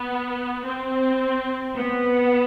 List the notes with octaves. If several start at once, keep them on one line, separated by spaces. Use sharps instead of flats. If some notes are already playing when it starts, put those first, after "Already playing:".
Already playing: B3
C4
B3